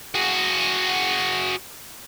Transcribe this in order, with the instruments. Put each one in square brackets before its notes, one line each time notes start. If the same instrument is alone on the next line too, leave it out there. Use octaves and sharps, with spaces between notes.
[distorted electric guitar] F#4 G#4